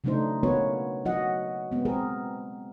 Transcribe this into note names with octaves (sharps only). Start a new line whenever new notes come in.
C#3 F#3 A3 D4 D#4 C5
A#3 B3 C#4 F#4 B4 C#5
F#3 F#4 D#5 F#5
G#3 B3 C4
C4 G#4 A#4